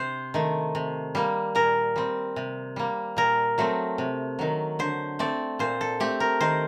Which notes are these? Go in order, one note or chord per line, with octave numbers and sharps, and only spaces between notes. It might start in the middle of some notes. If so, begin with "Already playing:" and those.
Already playing: C3 C5
D#3 A3
C3
G3 A#3
A#2 A#4
G3 C4
C3
G3 A#3
A#2 A#4
F#3 A3 C4
C3
D#3 F#3
D3 C5
A3 C4 D5
A#2 C5
A4
A3 C4 G4
A#4
D#3 C5